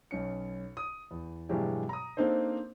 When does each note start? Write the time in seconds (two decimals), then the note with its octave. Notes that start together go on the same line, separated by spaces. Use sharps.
0.11 B1 C#4 C#7
0.77 D#6
1.11 E2
1.49 G2 B2 E3 F#3 G#3 G4
1.89 A#5 D#6
2.17 A#3 C4 D4 D#4 A4 C5